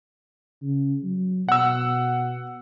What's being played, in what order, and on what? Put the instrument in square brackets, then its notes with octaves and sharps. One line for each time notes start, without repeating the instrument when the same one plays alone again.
[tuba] C#3
F#3
[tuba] B2 [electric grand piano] F#5 E6